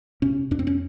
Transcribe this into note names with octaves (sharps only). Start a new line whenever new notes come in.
C3 C#4
F2 D4
C4
C#4